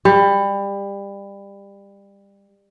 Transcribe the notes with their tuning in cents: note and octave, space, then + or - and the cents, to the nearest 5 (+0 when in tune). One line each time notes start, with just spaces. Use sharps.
G3 +25